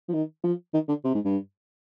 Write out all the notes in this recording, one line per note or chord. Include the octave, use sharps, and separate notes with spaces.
F3
D#3
F3
D#3
D3
C3
G#2
G2